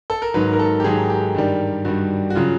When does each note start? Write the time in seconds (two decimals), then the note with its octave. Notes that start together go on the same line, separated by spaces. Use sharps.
0.10 A4
0.22 A#4
0.34 G#2 D#3 F#3 B4
0.53 A#4
0.59 A4
0.80 G4
0.84 G#2 D#3 F#3 G#4
1.10 G4
1.35 G2 D#3 G3
1.85 G2 D#3 G3 F#4
2.30 F#4
2.35 C#3 F#3 F4